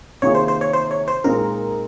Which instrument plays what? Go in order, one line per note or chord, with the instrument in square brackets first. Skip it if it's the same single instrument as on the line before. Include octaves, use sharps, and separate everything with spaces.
[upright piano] C3 D#3 A#3 F4 G#4 [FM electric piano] C#5
[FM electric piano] C5
C5
C#5
C5
C#5
C5
[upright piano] A#2 G#3 C4 D#4 [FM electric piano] A#4